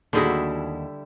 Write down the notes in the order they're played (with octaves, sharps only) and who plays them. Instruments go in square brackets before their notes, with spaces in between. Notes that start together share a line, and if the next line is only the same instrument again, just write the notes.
[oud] D#2 F#4 [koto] D3 G3 E4 [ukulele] D#4 G#4